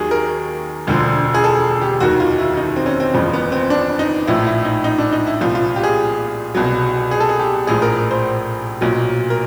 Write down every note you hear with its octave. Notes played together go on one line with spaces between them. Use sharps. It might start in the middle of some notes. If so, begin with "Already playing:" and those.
Already playing: D#2 D#3 F#3 G4 G#4
A#4
E1 D2 D3 F3
G#4
A4
G4
F1 D#2 D#3 F#3 F#4
F4
E4
D#4
C4
C#4
C4
F#1 E2 C#3 F3
B3
C4
D4
D#4
A#1 A2 F3 E4
E4
D#4
D#4
D4
D#4
E4
C2 A#2 F3 F4
F4
G4
G#4
C2 B2 F#3
G#4
A4
G#4
G4
A#1 A2 F3 G#4
A#4
C5
B1 A#2 F#3
A#4